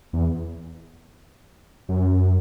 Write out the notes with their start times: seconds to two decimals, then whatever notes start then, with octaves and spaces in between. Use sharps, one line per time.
0.13 E2
1.89 F#2